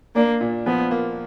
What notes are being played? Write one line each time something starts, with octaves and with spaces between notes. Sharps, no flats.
A#3 D4
A#2
F3 B3
A#3